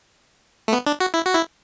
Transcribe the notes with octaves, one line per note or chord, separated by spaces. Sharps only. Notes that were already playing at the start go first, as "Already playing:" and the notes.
A3
B3
D4
F#4
E4
F#4
E4